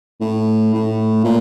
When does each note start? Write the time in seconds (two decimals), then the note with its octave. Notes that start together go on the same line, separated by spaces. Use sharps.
0.21 A2
0.73 A2
1.24 A#2